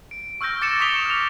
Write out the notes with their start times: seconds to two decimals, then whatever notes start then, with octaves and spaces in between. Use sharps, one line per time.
0.11 D7
0.41 C#6 E6 F6 G6 A#6
0.61 D6 A6 C#7 D7 E7
0.80 C#6 D#6 B6 C#7 F7 G7
1.06 F6 F7